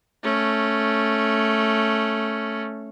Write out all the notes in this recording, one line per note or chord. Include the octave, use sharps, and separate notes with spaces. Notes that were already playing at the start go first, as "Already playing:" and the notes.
A3 C#4